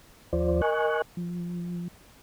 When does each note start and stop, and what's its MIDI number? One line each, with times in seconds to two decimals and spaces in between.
0.33 0.61 39
0.33 0.61 53
0.33 0.61 65
0.33 0.61 72
0.33 0.61 74
0.62 1.02 70
0.62 1.02 75
0.62 1.02 80
0.62 1.02 85
0.62 1.02 90
1.17 1.88 53